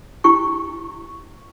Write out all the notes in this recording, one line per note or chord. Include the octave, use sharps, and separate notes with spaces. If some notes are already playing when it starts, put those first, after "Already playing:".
D4 E4 G4 C#6